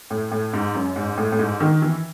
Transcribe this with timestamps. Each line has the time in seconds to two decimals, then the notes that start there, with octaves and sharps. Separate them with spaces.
0.10 A2
0.31 A2
0.53 G#2
0.75 F#2
0.96 G#2
1.18 A2
1.32 A2
1.39 G#2
1.60 D#3
1.82 E3